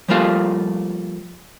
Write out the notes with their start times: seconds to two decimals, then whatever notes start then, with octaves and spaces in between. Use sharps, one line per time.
0.08 F3 G3 A3 A#3 F4 F5